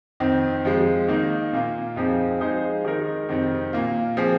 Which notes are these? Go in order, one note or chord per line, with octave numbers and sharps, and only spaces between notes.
F2 D#3 C4
F2 F3 G#3
D#3 A#3 D#4
A#2 A#3 F4
F2 F3 C4 D#4 G#4
F3 G#3 D#4 G#4 C5
D#3 G#3 D#4 A#4
F2 C3 D#3 C4
A#2 A#3 F4
F3 C4 G#4